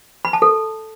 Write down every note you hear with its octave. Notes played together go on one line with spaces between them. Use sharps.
B5
A5
A4